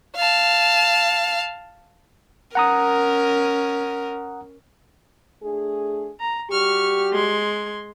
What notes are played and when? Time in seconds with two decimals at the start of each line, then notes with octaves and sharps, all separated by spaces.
0.16 F5 A5
2.55 C#4 A#4 F#5 A#5 D#6
5.43 A3 D4 G#4
6.20 A#5
6.50 G3 F#4 G4 C#6 F6
7.11 G#3 C6 G#6